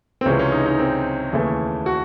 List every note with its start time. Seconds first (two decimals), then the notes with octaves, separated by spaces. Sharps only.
0.21 C4
0.25 C#2 C3 E3 G#3 C#4
0.39 C#4
0.52 D#4
0.66 D#4
0.79 C4
1.32 D#2 C#3 E3 A3
1.86 F#4